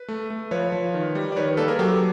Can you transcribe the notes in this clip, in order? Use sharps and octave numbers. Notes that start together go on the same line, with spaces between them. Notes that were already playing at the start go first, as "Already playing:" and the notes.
Already playing: B4
A3
A3
F3 B4 C#5
F3
D#3
G3
D5
D#3 B4 C#5
A#3 A4 B4
G#4 A#4
F#3 G4 A4